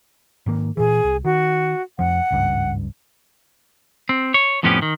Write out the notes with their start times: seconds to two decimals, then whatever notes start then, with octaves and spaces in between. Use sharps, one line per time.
0.46 G#2 D#3 A#3
0.77 A#2 E3 G#4
1.04 C2
1.25 D#3 F#4
1.99 F1 F2 F3 F#5
2.30 G#1 C#2 G2
4.09 C4
4.34 C#5
4.63 F2 A2 F3 B3 C#4 G4
4.82 D#3